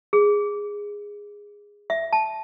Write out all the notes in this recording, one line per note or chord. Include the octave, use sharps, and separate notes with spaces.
G#4
E5
A5